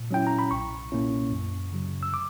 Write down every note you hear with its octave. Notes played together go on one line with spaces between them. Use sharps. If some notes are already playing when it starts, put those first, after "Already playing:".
Already playing: A#2
F#3 C#4 E4 G5
A#5
B5
B1 C#6
A#2 A#3 C#4 E4
F#2
C#3 F#3
E6
D6